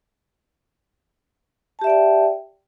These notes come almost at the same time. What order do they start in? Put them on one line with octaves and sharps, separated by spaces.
A5 G4 E5 D5 G5